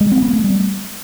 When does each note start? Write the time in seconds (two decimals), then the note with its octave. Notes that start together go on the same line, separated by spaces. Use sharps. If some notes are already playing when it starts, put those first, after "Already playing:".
0.01 G#3
0.11 C4
0.22 B3
0.33 A3
0.44 G3